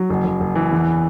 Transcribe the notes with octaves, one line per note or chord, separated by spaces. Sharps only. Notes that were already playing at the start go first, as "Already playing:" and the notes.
Already playing: F#3
F#1
F#1
F#1
E3
E2